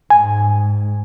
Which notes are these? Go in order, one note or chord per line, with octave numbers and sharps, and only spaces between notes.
G#2 G#5